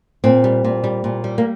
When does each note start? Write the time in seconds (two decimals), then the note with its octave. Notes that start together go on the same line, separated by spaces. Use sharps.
0.24 A#2 C4
0.44 G3
0.64 A#2
0.84 G3
1.04 A#2
1.24 G3
1.38 A#3